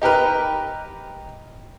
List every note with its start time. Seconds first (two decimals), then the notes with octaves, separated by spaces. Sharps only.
0.02 D#4 G4 A#4 B4